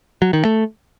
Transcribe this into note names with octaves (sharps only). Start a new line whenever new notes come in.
F#3
D#3
A3